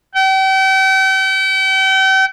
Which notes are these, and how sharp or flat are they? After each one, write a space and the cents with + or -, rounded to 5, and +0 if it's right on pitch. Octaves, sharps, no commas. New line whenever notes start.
G5 -40